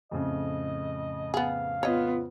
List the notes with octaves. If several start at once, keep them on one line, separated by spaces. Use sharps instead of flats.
F2 A2 C#3 D#5
B3 G#4 F5
B3 F4 C#5 D#5